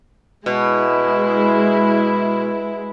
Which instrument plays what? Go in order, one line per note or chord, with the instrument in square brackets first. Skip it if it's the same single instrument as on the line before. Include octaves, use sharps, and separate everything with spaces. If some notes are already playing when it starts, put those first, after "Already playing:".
[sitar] B2 [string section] G#3 E4